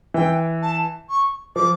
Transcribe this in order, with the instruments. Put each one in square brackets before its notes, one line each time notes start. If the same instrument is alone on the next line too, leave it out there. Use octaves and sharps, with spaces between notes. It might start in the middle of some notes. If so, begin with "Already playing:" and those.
[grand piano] E3 [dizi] G5
[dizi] A5
C#6
[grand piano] F3 [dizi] D6